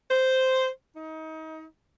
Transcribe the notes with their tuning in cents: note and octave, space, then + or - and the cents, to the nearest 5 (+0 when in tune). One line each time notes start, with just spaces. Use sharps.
C5 -5
D#4 +30